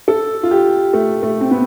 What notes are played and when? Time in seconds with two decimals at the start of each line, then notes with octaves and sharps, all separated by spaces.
0.08 A4
0.43 F4
0.51 G4
0.93 A3
1.23 A3
1.41 C4
1.51 B3